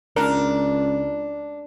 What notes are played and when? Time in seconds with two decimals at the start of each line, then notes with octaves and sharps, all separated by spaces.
0.16 C#2 D4 A#4